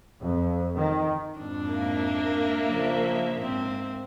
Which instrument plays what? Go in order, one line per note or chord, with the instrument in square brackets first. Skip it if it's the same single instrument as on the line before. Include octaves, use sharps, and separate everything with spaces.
[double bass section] F2
D#3
[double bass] F2 G#2 [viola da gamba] D4
[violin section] A#3 E5
[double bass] C#3 F3
[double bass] G#2 [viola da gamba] C4